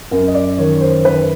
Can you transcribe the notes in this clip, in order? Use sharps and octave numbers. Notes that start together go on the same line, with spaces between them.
F#2 A#4
D#5
D5
D#3 C#5
C5
D#3 B4